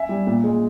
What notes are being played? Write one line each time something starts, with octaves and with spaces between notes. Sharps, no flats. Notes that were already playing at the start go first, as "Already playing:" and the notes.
Already playing: E5 G#5
G3
A#2
G#3